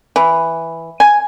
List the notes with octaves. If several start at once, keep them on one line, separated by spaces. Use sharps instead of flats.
E3
G#5